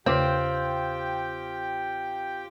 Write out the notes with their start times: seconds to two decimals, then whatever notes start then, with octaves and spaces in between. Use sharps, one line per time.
0.06 E2 C#3 C4 F4 G4 C#5 G5